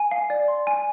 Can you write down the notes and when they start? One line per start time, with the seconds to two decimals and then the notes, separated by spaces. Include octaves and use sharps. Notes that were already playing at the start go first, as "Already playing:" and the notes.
Already playing: G#5
0.11 F5
0.30 D5
0.48 C6
0.67 G#5